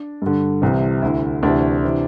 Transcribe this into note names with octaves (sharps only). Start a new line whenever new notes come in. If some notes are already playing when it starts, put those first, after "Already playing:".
Already playing: D4
G2 D3
C2 C3 E3
D2 D3 E4
D2 C3 E3 D4
C3 E3